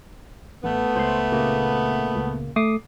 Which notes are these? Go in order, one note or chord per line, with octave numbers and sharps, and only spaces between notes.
A1 A3 B3
C#2 C5 C6
A#2 C#3 A#3
C#2
A3 D6 D#6 C7